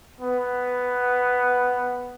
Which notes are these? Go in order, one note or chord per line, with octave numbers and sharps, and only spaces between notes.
B3